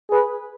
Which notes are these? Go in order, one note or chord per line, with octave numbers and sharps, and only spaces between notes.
G#4 B4